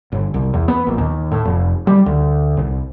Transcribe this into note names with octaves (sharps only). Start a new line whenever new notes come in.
G1
C2
E2
B3
A#1
D#2
A2
F1
G3
D2
C2